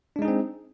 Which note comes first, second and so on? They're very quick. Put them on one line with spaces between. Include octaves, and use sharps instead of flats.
D4 G#3 D#4 G#4 C4